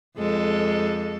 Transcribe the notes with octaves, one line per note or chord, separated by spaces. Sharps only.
F2 G#3 A4